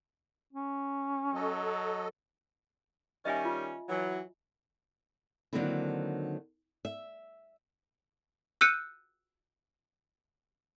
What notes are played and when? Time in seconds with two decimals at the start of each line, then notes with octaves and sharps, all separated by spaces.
0.53 C#4
1.34 F#3 A4 D#5
3.25 D#3 G3 C#4 D#5 E5 G#5
3.45 F4
3.89 E3 F#3
5.53 D3 D#3 F#3 A#3 C4 E4
6.85 E5
8.61 E6 F#6 G6 C#7 D#7